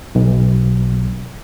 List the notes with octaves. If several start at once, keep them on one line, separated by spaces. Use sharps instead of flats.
B1